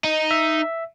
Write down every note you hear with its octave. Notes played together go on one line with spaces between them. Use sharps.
D#4
E5